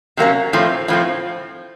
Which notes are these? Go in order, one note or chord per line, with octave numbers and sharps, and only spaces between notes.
C3 F#3 A#3 C#4
A2 F3 C4
A2 F3 C4